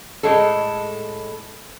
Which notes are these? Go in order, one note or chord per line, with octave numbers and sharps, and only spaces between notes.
A2 G#3 A4